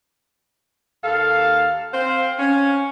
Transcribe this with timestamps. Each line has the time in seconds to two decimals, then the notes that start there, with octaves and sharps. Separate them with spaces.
1.04 D#2 A4 F5
1.93 C4 C5 F5
2.39 C#4